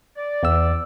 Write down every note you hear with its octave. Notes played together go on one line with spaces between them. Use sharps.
D5
E2 E6